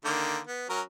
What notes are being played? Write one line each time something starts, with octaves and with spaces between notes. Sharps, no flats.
D3 D#3 A#3
B3
F#3 C#4 A#4